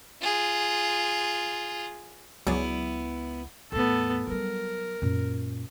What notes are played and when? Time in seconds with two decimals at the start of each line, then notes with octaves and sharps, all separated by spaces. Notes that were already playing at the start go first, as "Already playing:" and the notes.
0.21 F4 G#4
2.47 C#2 F#3 B3 E4 G#4 D5
3.72 E2 A2 B3 A4
4.27 F#3 G3 A#4
5.02 F#2 A#2